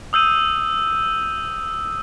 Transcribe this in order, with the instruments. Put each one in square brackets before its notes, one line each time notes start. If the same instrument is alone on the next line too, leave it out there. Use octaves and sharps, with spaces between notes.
[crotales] D#6 E6 G6 D#7